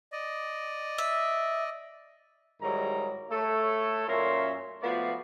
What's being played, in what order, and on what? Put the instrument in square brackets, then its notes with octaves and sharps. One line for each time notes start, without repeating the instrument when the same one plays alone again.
[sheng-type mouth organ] D5 D#5
[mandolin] E5
[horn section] G#2 D#3 F#3 G3 E4 A#5
A3 A4 C#5
F#2 A#2 C#4 A#4 E5 C6
F3 A3 B3 F#4 D5 F5